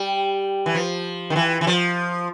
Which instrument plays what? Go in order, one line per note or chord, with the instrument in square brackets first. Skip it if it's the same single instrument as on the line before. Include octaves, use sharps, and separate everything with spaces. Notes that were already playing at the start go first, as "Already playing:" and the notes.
Already playing: [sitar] G3
E3
F3
D#3
E3
E3
F3